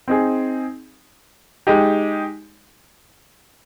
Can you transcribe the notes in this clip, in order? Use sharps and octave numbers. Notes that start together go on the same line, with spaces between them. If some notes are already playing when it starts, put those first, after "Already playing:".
C4 D#4 G#4
G#3 D#4 G4